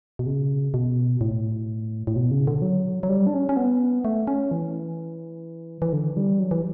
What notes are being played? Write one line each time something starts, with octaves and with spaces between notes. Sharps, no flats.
B2
C#3
B2
A2
A2
B2
C#3
D3
F#3
F#3
G3
D4
C#4
C#4
B3
A3
C#4
E3
E3
D3
G3
F#3
E3